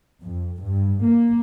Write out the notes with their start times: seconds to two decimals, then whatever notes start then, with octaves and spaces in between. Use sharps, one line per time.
0.21 F2
0.63 G2
1.03 A#3